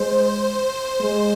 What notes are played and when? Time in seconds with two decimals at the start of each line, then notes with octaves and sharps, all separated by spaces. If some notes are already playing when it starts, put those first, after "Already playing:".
Already playing: G#3 C5
1.00 G#3